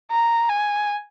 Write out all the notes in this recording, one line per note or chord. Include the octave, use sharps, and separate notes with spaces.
A#5
G#5